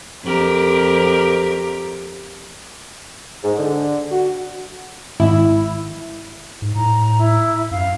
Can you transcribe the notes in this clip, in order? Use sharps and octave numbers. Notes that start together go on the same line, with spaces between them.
F2 G4 A#4
G#2
D3
F#4
G#1 E4
G#2
A2 A#5
E4
F#2 F5